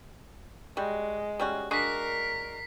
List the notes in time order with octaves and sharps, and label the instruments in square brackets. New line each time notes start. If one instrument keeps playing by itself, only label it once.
[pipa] G3 F#4 [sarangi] G#3
[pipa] G3 C#4 F#4
[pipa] G#3 D4 F#4 [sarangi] A#4 [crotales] B6 C7